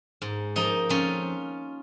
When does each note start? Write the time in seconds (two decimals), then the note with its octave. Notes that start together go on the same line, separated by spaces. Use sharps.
0.22 G#2
0.56 F3 A#3 D#4
0.89 F2 C#4 F4